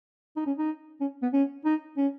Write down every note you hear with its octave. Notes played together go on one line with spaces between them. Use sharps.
D#4
C#4
D#4
C#4
B3
C#4
D#4
C#4